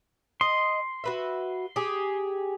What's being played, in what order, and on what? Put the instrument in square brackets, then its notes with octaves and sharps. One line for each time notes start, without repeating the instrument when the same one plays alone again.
[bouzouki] D#5 [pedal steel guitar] C6
[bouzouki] F#4 B4 E5
G4 G#4